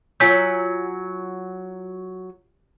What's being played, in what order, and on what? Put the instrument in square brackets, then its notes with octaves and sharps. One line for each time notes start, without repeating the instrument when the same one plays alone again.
[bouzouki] F#3 [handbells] F4 G#5 E6 [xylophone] G6 B6